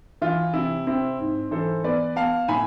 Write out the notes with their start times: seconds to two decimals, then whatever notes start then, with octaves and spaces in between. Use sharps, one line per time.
0.22 E3 F4
0.54 C3 E4
0.87 C4 E4
1.20 G#2
1.51 E3 A4 C5
1.84 B3 B4 D5
2.16 B3 F5 A5
2.48 A2 G#5 B5